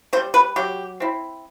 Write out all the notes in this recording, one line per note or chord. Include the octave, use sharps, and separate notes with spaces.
C4 C5
G3
B4
F#3 G4
C4 E4